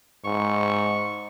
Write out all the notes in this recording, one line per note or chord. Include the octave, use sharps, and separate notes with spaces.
G#2 C#6